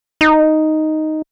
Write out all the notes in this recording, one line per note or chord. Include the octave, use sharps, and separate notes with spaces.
D#4